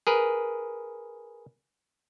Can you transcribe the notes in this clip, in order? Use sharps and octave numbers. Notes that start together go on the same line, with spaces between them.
G#4 A#4 B4